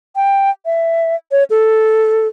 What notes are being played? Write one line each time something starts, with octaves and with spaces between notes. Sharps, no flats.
G5
E5
C#5
A4